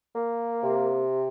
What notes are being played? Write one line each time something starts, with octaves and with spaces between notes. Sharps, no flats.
A#3
C3